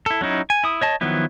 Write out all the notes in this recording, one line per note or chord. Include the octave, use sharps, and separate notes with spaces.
E4 A4
F#3 C#4 D#4 E4
G#5
E4 D#6
C#5 D#5 A5
D#3 F3 F#3 B3 E4